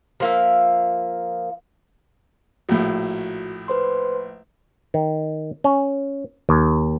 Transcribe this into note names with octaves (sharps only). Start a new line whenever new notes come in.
F3 A#3 E5
A#1 A2 F#4
B4 C5 C6
D#3
C#4
D#2